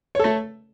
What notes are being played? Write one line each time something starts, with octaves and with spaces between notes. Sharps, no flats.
A3 A4 C#5